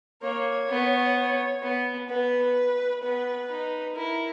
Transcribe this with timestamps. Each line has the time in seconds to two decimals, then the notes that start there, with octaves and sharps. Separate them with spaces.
0.22 A#3 C#5
0.70 B3
1.16 C#5
1.63 B3
2.09 B3 B4
3.03 B3 B4
3.49 D#4
3.96 E4 A#4